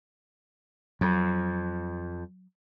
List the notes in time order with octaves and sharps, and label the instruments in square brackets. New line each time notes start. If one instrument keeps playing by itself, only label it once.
[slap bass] F2 [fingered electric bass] F#3